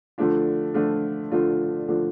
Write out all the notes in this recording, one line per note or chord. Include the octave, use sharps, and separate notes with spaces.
D3 F3 A3 D4 F4
D3 F3 A3 D4 F4
D3 F3 A3 D4 F4
D3 F3 A3 D4 F4